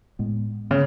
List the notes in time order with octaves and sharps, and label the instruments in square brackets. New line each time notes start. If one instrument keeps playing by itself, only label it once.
[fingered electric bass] A2 G#3 B3
[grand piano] C#3 [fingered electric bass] B3